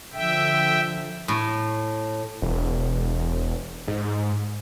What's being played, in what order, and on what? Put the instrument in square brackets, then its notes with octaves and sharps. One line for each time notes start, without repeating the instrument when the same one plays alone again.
[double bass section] D3 F3 [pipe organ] E5 G5
[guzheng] A2
[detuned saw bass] E1
G#2